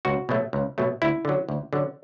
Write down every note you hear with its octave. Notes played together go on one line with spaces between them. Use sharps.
C#2 F#4
B2 F#3 A3
C#2
B2 F#3 A3
D2 E4
D3 F#3
D2
D3 F#3